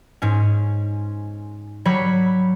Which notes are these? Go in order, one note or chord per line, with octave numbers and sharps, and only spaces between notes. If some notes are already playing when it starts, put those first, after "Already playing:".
G#2 C#4
F#3 G3 C#5 B5